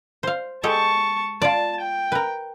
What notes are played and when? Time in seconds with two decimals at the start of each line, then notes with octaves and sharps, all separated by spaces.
0.23 C5 F5
0.63 G#3 G4 A4 A5 C#6
1.42 F4 D5 A5
1.80 G5
2.12 A#4 B4